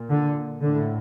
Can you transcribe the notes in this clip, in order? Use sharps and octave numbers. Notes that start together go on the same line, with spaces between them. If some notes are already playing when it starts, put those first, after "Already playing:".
Already playing: A#2
D3
A2 D3